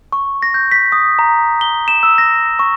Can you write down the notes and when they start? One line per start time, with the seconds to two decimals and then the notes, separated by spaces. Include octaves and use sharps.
0.13 C#6
0.42 A#6
0.54 G6
0.72 B6
0.92 D#6
1.19 A#5
1.61 G7
1.88 E7
2.03 E6
2.18 A#6
2.59 C#6